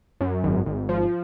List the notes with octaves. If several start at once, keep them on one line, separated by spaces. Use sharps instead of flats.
F#2
G#1
G#1
F3